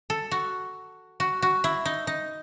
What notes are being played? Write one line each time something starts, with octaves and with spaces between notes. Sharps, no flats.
A4
F#4
F#4
F#4
E4
D#4
D#4